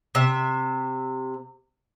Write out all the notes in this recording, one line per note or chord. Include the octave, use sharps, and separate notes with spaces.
C3 E5